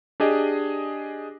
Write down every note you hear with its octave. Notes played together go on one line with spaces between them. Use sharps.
D4 G4 G#4 D#5